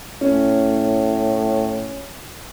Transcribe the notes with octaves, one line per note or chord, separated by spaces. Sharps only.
A2 C#4